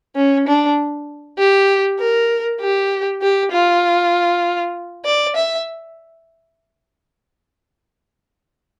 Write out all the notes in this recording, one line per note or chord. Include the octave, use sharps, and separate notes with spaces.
C#4
D4
G4
A#4
G4
G4
F4
D5
E5